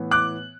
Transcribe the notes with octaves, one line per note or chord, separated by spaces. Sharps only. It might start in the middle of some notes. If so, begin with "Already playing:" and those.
Already playing: A2 E3 B3
D6 F#6